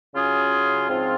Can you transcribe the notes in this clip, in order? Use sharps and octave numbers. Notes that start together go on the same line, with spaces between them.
C#3 F#3 C#4 F4 G#4
G#2 F3 C4 F4